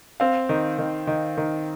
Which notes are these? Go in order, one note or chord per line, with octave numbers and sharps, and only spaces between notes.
C4 F5
D#3
D#3
D#3
D#3